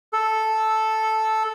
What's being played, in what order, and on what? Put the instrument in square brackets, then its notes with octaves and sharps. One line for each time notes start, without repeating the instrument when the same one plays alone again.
[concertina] A4